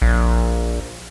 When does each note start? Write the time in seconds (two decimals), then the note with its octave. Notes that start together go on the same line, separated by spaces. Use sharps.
0.02 A#1